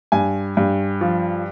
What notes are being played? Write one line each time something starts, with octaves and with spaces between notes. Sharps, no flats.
G2 G#5
G2
F3